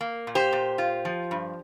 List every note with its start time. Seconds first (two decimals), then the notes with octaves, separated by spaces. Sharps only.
0.01 A#3
0.27 A#2
0.35 G4 C5
0.53 A#2
0.78 F4
1.05 F3
1.31 G2